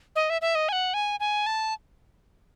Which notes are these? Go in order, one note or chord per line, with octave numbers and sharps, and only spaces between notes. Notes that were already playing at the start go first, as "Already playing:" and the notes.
D#5
E5
E5
D#5
G#5
F#5
G#5
G#5
A5